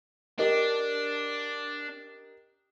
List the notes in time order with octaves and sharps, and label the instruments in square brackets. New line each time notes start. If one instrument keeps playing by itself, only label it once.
[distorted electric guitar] D4 [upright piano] G4 A#4 D#5